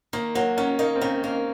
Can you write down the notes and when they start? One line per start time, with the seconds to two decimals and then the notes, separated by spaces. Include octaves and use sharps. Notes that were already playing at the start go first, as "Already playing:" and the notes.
0.13 D#3 A#3
0.35 F#3 A#3
0.58 D#3 C#4
0.79 A#3 D#4
0.96 C4
1.01 D#3 C#4
1.24 A#3 C#4